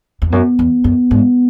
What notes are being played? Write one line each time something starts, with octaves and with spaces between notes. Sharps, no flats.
E2
F#2 B3
E2
F#2
G#2